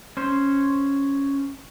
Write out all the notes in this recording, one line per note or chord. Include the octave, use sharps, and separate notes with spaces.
C#4 C5